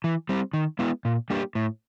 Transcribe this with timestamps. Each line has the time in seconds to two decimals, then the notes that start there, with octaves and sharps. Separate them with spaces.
0.04 E3
0.29 G3 C4
0.53 D#3
0.79 G#3 B3 E4
1.05 A#2
1.30 G3 A#3 D4 G4
1.55 A2